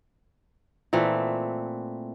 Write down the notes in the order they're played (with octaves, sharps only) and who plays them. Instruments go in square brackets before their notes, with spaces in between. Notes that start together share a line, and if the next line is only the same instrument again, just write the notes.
[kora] A#2 E3 A3 C4